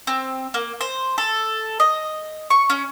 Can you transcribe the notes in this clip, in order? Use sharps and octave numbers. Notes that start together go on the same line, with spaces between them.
C4
A#3
C5
A4
D#5
C#6
C#4